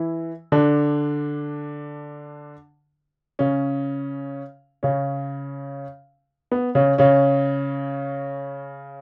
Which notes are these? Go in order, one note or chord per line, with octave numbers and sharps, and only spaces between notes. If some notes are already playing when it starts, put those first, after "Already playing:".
Already playing: E3 E4
D3 D4
C#3 C#4
C#3 C#4
B3
C#3 C#4
C#3 C#4